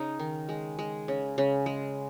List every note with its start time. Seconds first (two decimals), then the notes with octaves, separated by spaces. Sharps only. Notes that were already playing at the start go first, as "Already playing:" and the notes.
Already playing: C#3 D#4
0.19 D#3
0.49 G#3
0.79 G#3
1.08 C#3
1.38 C#3
1.66 G#3